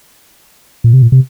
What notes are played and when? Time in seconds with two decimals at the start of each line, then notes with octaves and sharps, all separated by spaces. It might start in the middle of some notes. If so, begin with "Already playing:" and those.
0.84 A#2
0.93 C3
1.02 A#2
1.12 C3